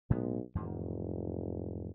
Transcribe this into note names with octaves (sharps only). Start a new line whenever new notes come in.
B1 A2 G#3 B3
F1 E2 G#2 D#3